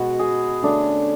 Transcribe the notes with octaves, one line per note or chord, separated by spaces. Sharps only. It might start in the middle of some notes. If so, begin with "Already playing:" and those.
Already playing: B2 G#3 B3 F#4
G#4
D3 A3 C#4 D4